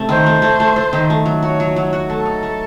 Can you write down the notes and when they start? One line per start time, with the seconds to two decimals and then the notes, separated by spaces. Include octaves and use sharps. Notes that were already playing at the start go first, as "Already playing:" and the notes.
Already playing: C3 A3 C4
0.09 D#3 C5
0.26 A3
0.42 A3
0.60 A3
0.76 A3
0.93 D#3
1.10 A3
1.26 F#3
1.42 F#4 C#5
1.60 F#3
1.76 F#3
1.93 F#4
2.10 A3 A4
2.26 D#4
2.43 A3